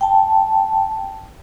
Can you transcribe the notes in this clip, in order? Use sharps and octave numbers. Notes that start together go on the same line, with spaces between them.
G5 A5